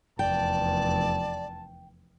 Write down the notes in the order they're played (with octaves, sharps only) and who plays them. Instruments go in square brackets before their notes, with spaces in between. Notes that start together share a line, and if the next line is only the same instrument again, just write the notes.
[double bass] F1 E2 [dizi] D5 [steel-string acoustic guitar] G5 [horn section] A5